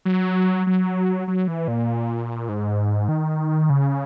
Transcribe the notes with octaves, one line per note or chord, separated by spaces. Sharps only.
F#3
F#3
F#3
E3
A#2
G#2
D#3
C#3